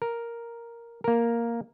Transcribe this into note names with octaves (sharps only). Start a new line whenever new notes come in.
A#4
A#3 A#4